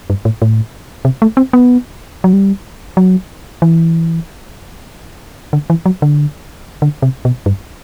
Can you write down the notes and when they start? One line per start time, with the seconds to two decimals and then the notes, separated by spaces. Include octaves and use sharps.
0.10 G2
0.25 A2
0.42 A2
1.05 C3
1.22 A3
1.37 C4
1.53 B3
2.24 F#3
2.33 G3
2.97 F#3
3.62 E3
5.53 D3
5.70 E3
5.86 F#3
6.02 D3
6.82 D3
7.02 C3
7.25 B2
7.46 G2